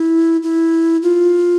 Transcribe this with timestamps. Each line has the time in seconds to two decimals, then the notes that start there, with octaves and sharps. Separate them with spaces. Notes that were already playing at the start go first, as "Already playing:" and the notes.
Already playing: E4
0.43 E4
1.03 F4